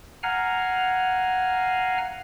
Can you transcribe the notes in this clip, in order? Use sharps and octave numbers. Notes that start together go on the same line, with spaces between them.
F5 F#5 G#5 A#5 F6